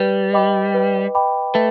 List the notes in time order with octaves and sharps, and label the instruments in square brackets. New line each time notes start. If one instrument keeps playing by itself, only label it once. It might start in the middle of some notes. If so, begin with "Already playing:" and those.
Already playing: [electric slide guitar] G3 [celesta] B4
[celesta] D#5 G5 B5 D6
B4
D#5 G5 B5 D6
[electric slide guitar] A3 [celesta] B4